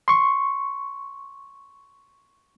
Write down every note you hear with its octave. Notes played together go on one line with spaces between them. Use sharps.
C6 C#6